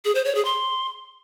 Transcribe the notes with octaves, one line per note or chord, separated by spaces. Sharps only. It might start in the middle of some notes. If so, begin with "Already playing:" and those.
G#4
C5
C#5
G#4
C6